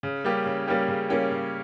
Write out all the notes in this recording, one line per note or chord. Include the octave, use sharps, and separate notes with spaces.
C#3
G3 A#3 C#4 G4
C#3
G3 A#3 C#4 G4
C#3
G3 A#3 C#4 G4
C#3